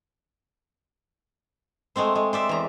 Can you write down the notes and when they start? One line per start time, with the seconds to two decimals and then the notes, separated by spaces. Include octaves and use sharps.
1.96 G#3 A3 C4 C5
2.15 G#3
2.33 C5 D5 E5
2.49 E2 A#5